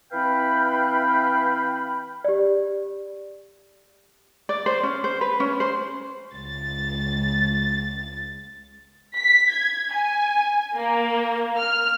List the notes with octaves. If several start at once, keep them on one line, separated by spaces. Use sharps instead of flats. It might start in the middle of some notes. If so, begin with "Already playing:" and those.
E3 C4 B4 F5 G5 B5
G4 D5
D5
C5
C#4
C5
B4
C#4
C5
C#2 A6
B6
G#6
G#5
A#3
F6